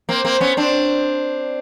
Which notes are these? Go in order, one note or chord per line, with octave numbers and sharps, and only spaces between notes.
A#3 C4
A#3 C4
B3 C#4
C4 D4